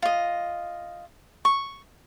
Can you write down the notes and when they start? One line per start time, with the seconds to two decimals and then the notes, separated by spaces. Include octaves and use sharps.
0.02 F4 D#5
1.45 C#6